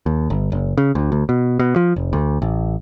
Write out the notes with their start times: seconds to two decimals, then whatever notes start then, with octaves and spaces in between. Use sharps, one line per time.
0.06 D#2
0.30 G1
0.52 F#1
0.78 C#3
0.95 D2
1.12 D2
1.29 B2
1.59 B2
1.76 F3
1.96 F1
2.13 D2
2.42 A1